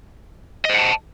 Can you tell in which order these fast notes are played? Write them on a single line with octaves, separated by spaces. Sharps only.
D#5 C5 F#5 A5